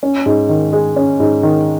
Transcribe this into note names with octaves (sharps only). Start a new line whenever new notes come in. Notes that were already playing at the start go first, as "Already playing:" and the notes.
C#4
G#2
D#3
G#3
C#4
G#2
D#3